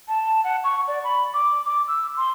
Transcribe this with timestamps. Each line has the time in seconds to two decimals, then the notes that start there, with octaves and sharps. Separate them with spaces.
0.08 A5
0.44 F#5
0.64 C#6
0.88 D5
1.04 B5
1.34 D6
1.65 D6
1.88 E6
2.17 C6